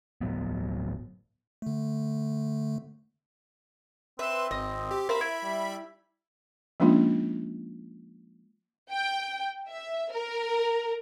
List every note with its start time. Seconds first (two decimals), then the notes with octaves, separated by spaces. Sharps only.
0.21 D1 A2 F#3 B3
1.62 D3 A3
4.19 C4 B4 E5 C6
4.51 G#1 D#5
4.91 G4
5.09 A#4 C5 E5 F5 B5 B6
5.21 E4
5.44 G3
6.80 F3 G#3 A#3 C#4 D4 F4
8.90 G5
9.69 E5
10.12 A#4